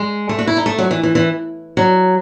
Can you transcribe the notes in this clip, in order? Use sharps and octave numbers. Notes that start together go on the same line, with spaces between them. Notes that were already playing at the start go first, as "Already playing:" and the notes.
Already playing: G#3
A3
F#4
E4
D#4
A3
F#3
E3
E3
E3
F#3